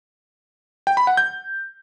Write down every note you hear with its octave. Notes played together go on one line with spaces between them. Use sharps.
G5
B5
F#5
G6